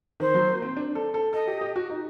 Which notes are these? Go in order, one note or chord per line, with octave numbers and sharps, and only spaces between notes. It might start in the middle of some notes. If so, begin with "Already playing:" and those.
D#3 C5
F#3
A#3
C4
D4
A4
A4
A4 D#5
G4
G4
F#4
D#4